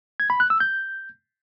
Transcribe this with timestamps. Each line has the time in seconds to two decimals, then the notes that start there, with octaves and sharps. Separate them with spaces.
0.20 G#6
0.30 B5
0.40 F#6
0.50 E6
0.60 G6